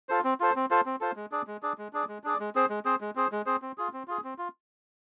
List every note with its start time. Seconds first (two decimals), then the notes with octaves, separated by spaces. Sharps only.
0.09 F4 A4 C5
0.24 C4
0.40 F4 A4 C5
0.56 C4
0.70 F4 A4 C5
0.86 C4
1.01 F4 A4 C5
1.16 G#3
1.32 D4 G#4 D5
1.47 G#3
1.63 D4 G#4 D5
1.78 G#3
1.93 D4 G#4 D5
2.08 G#3
2.24 D4 G#4 D5
2.40 G#3
2.55 C4 G#4 C5
2.69 G#3
2.85 C4 G#4 C5
3.01 G#3
3.15 C4 G#4 C5
3.32 G#3
3.46 C4 G#4 C5
3.62 C4
3.78 F4 G#4
3.93 C4
4.08 F4 G#4
4.24 C4
4.38 F4